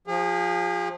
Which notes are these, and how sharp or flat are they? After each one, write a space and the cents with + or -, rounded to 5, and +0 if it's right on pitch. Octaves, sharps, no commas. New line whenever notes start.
F3 +20 G#4 -35